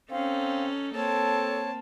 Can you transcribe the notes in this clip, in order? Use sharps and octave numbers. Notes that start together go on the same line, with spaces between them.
C4 C#4 D#4 A4 F5
A#3 C4 A4 C#5 A5